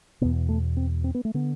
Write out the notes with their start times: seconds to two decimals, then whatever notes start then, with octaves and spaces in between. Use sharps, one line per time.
0.21 E2 B2 B3
0.49 A3
0.77 C4
1.04 C4
1.15 B3
1.25 A3
1.34 D3 B3